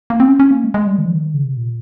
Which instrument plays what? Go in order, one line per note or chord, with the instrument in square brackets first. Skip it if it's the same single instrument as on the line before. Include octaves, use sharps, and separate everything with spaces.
[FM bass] A#3
C4
C#4
C#4
A#3
G#3
G#3
G3
D#3
F3
D#3
C#3
C3
A#2